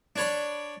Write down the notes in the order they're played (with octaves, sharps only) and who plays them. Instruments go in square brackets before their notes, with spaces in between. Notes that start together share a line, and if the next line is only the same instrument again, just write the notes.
[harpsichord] D4 C#5 B5